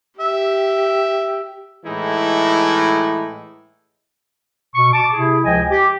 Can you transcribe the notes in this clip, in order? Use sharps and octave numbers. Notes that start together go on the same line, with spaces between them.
G4 E5
A2 E3 G#3 D#4 E4
B2 C#6
A5 D6
C3 E4 G#4
C#2 F3 D#5 G5 G#5
G4